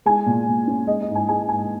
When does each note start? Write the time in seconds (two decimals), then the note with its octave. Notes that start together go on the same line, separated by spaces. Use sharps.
0.06 G#3 G#5
0.26 A#2
0.47 A#2
0.67 C#4
0.87 G#3 D#5
1.01 D#5
1.08 G#2
1.15 G#5
1.29 G#3 G#5
1.49 G#2 G#5